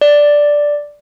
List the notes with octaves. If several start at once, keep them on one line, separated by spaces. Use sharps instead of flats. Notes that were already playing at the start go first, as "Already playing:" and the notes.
D5